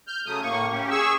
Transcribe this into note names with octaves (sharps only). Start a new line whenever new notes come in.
F6 G6
C#3 F#3 A3 D#6
A2 A#3 C#6
C#4 G4
G#4 C#6 E6